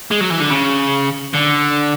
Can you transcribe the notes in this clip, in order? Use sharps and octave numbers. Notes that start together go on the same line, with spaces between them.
G#3
F#3
E3
D3
C#3
D3